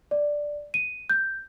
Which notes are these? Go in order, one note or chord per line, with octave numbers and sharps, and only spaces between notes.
D5
D#7
G6